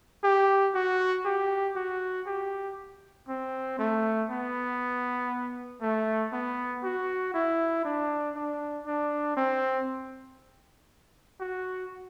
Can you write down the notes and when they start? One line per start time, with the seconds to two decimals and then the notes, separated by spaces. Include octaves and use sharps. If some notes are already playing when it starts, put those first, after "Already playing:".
0.24 G4
0.74 F#4
1.25 G4
1.76 F#4
2.27 G4
3.29 C4
3.79 A3
4.30 B3
5.82 A3
6.33 B3
6.84 F#4
7.34 E4
7.85 D4
8.36 D4
8.86 D4
9.37 C4
11.40 F#4